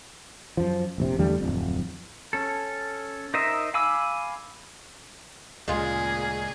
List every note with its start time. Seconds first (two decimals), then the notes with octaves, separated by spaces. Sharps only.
0.57 F#2 F3
0.98 F1 A#1 C3
1.18 E2 D3 G3 A3
1.40 D1 A#1 F2
2.33 C#4 A4
3.34 D#4 A#4 C5 D#5 E5
3.74 F5 G#5 B5 D6 E6
5.68 D2 A#2 C#3 G#3 F4 G#4